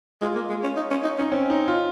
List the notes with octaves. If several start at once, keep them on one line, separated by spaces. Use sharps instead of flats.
G#3 F4
A#3
G#3
C#4
D#4
C#4
D#4
C#4 D#4
C4 C#4
D#4
F4